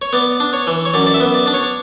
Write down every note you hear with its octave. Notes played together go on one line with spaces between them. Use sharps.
C#5
B3 D5
D4
C#5
E3
C#5
F#2 D5
D5
E5
B3
D5
D4 D5
C#5